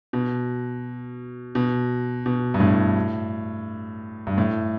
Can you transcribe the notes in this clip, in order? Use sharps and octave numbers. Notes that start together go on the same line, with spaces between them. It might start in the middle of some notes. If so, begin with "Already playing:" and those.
B2
B2
B2
G2
A2
G2
A2